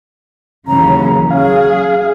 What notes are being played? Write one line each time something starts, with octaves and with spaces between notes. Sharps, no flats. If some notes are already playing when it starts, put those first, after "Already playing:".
D#2 C#3 E3 F#3 A#5
F#3 C#4 G#4 F5